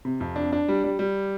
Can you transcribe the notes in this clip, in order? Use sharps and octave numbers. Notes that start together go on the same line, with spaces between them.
C3
F2
D4
D4
G3
G3
G3